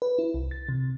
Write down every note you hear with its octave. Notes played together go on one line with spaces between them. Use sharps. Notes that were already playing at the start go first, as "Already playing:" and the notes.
B4
E4
C2
A6
C3